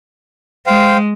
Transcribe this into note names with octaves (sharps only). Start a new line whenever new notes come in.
G#3 C5 F5 G5